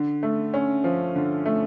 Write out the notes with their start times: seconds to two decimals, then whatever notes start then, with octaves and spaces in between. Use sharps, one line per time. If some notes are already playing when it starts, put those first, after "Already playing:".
Already playing: D3
0.23 A3
0.54 C#4
0.84 F3
1.16 D3
1.45 A3